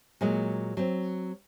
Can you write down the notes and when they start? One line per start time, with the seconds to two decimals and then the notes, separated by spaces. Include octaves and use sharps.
0.21 A#2 F#3 G#3
0.77 F#3 C4